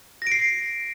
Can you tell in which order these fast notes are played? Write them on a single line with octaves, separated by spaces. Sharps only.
A#6 D7 C7